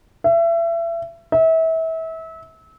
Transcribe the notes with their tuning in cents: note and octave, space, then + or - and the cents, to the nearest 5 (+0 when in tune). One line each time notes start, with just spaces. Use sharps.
E5 +30
E5 -30